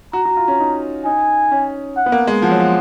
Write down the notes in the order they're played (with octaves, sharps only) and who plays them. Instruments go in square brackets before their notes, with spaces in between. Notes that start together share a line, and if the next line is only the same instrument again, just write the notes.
[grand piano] F#4 [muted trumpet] A#5
[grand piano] F#4
F4
C#4
D#4
[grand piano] D#4 [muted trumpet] G#5
[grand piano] C#4
[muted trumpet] F#5
[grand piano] B3
A#3
G#3
[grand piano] F3 [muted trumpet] F#5
[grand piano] F#3
F3